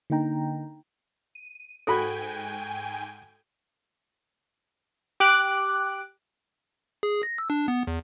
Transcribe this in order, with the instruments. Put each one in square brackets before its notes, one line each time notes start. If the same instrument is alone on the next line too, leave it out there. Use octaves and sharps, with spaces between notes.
[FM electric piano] D3 A#3 D#4 G5 A#5
[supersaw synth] D#7
[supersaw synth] G#2 G5 G#5 [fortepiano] F#4 B5 [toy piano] A4
[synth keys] G4 D6 F#6
[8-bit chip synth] G#4
A#6
E6
D4
B3
E2